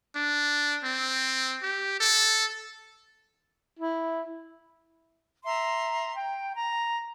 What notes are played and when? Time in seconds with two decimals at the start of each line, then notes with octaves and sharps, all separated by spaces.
0.15 D4
0.84 C4
1.63 G4
2.00 A4
3.79 E4
5.44 E5 A#5 C6
6.15 G5
6.53 A#5